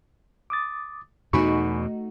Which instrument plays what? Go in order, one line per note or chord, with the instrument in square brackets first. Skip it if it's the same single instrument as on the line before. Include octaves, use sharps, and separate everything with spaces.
[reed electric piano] D6 D#6 A6
[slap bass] E2 B2 [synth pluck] A3 D#4 F#4 [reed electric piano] G#5 B5 C#6